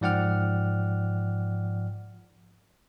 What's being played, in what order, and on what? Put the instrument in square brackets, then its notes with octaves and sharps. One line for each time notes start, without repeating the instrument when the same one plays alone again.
[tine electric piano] G#2 F3 D5 F#5 G5 F6